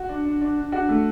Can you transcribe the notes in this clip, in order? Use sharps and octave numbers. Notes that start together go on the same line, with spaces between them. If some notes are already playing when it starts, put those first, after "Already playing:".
Already playing: F#4
D4
D4
D4
D4
D4 F#4
A3